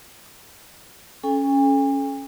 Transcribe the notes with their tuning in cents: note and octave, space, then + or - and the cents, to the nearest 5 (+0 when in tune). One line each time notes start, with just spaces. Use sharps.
C#4 +0 A4 -30 G#5 -45